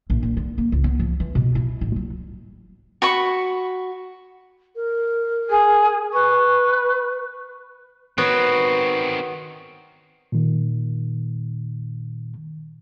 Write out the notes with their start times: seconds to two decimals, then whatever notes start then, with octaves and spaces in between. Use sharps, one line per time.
0.10 A#1
0.23 A#2
0.37 D3
0.58 A#3
0.72 C#2
0.84 B3
0.99 F3
1.20 E3
1.35 B2
1.55 E4
1.81 A1
1.96 F#3
3.02 F#4 B5 C#6
4.76 A#4
5.49 G#4
6.13 B4 C#6
8.18 D#3 B3 C4 F#4 C#5
10.32 A#2 D#3